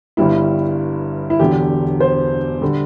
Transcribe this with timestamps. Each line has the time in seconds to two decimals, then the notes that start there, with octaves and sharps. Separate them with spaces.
0.17 G1 G2 G3 E4
1.30 E4
1.40 E1 E2 D3 G4
2.00 C5
2.61 D3 G3